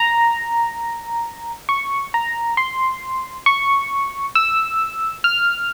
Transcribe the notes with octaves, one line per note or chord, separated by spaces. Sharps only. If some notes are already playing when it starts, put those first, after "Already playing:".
Already playing: A#5
C#6
A#5
C6
C#6
E6
F6